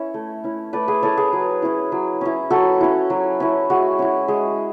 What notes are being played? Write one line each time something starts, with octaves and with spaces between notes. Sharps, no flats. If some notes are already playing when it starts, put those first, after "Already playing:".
Already playing: C#4 E4 C#5 E5
A3
C#4 E4
A3 B4 D5
G#4 B4
C#4 E4 A4 C#5
G#4 B4
F#3
C#4 E4
F#3
C#4 E4
F#3 F#4 A4
C#4 E4
F#3
C#4 E4
G#3 F#4
C#4 E4
G#3